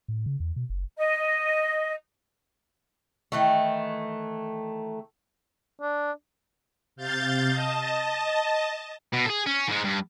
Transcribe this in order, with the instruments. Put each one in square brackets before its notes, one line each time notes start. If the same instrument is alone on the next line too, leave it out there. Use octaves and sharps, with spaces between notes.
[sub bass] A2
C#3
E2
B2
F#1
[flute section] D#5
[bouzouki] D#3 E3 A3
[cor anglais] D4
[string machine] C3 F5 G6 A6
D#5 A5
[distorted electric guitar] B2
G#4 A4
C#4
G#2 G#3
G2